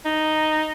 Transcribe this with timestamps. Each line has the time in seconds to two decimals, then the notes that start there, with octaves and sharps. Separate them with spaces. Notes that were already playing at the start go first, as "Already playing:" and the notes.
0.05 D#4